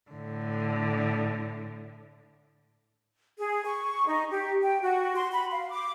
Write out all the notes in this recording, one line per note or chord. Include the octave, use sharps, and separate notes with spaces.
A2 D3
G#4
C#6
D#4
G4
G5
F#4
C6
B5
F5
D6